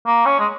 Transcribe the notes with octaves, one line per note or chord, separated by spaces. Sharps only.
A#3
C#4
G#3